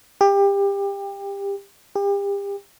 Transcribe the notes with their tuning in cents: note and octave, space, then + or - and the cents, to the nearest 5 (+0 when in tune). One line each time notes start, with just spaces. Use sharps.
G4 +25
G4 +35